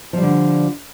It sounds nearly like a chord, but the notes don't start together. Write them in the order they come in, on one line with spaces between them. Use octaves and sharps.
F3 G3 D3